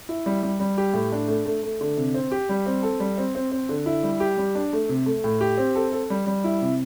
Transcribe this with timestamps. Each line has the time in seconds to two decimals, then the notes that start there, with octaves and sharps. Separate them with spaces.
0.09 E4
0.26 G3
0.43 G3
0.60 G3
0.78 G4
0.94 A2
1.12 D4
1.28 A3
1.46 A3
1.63 A3
1.81 D3
1.98 C3
2.14 C4
2.31 G4
2.49 G3
2.66 C4
2.83 A4
3.00 G3
3.18 C4
3.35 C4
3.52 C4
3.69 D3
3.86 E4
4.03 G3
4.20 G4
4.38 G3
4.55 D4
4.73 A3
4.89 C3
5.06 A3
5.24 A2
5.41 G4
5.58 C4
5.75 A4
5.92 A4
6.10 G3
6.27 G3
6.44 E4
6.62 C3